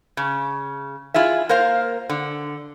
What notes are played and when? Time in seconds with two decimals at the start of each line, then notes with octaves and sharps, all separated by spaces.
0.17 C#3
1.14 E4 F4 G#4 E5
1.49 A#3 A#4 C5 F5
2.09 D3